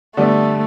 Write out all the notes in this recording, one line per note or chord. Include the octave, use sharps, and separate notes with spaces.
D3 G3 A3 B3 D4